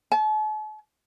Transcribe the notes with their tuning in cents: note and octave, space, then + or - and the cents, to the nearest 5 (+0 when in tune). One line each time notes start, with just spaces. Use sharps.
A5 -45